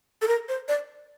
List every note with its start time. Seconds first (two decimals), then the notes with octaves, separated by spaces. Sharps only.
0.22 A4
0.28 A#4
0.49 C5
0.68 D5